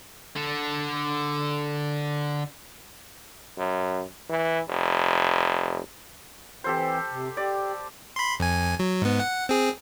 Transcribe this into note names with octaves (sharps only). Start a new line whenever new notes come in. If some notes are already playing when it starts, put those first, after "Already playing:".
D3 A4
F#2
E3
F1
E3 C4 G4 A4 C5
C3
G4 D5
B5 C6
F2 G#5
F#3
G#2 B3
F#5
C4 G#4